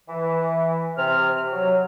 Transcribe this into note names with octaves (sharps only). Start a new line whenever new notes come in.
E3
C3 F6
F#3